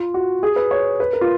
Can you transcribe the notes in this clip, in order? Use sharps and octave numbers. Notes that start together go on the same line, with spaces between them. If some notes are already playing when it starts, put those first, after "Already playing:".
Already playing: F4
F#4
G#4
B4
C#5
B4
A#4
F4